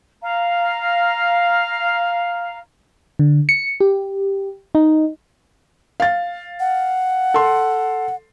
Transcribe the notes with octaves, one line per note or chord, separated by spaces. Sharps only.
F5 A#5
D3
C#7
G4
D#4
F5 A6
F#5
A4 C6